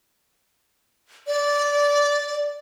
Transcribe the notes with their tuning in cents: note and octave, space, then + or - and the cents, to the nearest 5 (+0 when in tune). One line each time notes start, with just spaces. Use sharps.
D5 -15